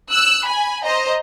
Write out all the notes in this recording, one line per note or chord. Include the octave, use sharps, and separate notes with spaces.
E6 F#6
G#5 B5
C5 D#5 A#5